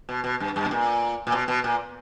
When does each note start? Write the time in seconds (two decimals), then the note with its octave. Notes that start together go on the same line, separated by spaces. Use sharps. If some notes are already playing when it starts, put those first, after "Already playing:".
0.09 B2
0.24 B2
0.40 G2
0.56 G2
0.65 B2
0.71 A#2
1.27 A#2
1.32 B2
1.48 B2
1.64 A#2